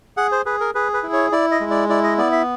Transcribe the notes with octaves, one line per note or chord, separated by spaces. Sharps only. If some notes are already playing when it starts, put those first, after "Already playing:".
G#4 F#5
C5
G#4 B4
A#4
G#4 B4
B4
E4
C#5
E4 D5
D#5
G#3
D5
E4 D5
D#5
B3 D5
E5